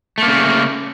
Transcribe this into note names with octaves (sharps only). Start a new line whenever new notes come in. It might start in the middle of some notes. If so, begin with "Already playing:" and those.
C#3 A3 A#3